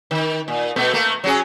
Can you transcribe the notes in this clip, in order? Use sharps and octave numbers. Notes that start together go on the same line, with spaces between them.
D#3
A#2
B2 A3 B3
A3 A#3
F#3 C#4 G#4